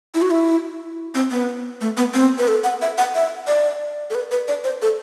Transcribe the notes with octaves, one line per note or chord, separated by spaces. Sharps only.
E4
F#4
E4
C4
B3
A3
B3
C4
B4
A4
F#5
E5
F#5
E5
D5
A4
B4
B4
D5
C5
A4